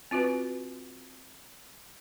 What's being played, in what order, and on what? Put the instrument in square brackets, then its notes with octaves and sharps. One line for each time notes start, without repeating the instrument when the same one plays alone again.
[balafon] C4 F4 F#4 B4